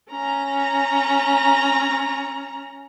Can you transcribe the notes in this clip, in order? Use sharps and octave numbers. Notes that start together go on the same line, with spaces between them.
C#4 A#5